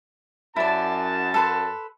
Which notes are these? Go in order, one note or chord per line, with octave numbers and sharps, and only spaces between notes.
F#2 E4 D5 A5
A4 B4 C6